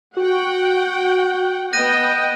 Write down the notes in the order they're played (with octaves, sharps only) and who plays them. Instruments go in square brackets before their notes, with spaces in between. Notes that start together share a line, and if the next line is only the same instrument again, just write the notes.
[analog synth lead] F#4 [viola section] F#5 G5
[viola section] B3 D#5 G5 [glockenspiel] F#6 A#6 D#7 [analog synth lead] G6